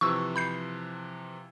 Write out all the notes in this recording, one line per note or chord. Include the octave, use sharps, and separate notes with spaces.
C3 E3 F3 C#6 E6
B5 G6 C7